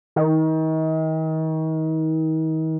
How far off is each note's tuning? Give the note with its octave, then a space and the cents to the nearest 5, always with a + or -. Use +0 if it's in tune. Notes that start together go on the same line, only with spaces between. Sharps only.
D#3 +35